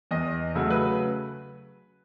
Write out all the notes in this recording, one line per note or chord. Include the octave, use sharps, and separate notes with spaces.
E2 D#5
C#3 F#3 A3
B4